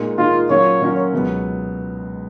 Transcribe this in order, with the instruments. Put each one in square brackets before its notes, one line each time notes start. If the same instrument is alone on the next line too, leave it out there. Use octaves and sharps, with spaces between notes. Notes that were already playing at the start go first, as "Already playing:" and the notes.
Already playing: [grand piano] A#2 G#3 D#4 A#4
[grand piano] A#2 G#3 D#4 A#4 [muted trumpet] F4
[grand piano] A#2 F#3 C#4 F4 A#4 [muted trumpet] C#5
[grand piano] A#2 F#3 C#4 F4 A#4
C#2 B2 F#3 B3